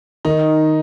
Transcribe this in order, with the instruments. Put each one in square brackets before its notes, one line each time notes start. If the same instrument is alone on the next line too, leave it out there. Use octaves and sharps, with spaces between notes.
[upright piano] D#3 [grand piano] D#4